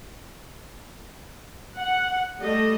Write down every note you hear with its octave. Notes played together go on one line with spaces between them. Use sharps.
F#5
G3 A3 D#5